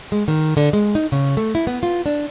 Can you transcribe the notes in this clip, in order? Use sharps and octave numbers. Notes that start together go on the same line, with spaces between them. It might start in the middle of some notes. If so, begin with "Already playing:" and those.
G#3
D#3
D3
G#3
D#4
C#3
A3
E4
B3
F4
D4